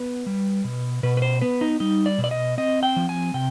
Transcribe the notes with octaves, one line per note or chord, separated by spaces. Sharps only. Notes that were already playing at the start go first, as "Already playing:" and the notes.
Already playing: B3 B4
G3
B2
B2 B4
B4
C5
B3 B4
D#4
G3 D#4
D5
B2
D5
D#5
C4 D#5
G5
F3
G#5
C3 G5